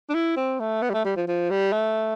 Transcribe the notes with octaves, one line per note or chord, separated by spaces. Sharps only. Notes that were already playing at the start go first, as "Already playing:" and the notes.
D4
E4
C4
A3
B3
G3
A3
G3
F3
F3
G3
A3